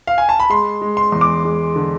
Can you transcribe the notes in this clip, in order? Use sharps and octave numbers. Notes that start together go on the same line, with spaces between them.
F5
G#5
A5
B5
G#3 C6
G#3
C6
E2
D6
G#3
D3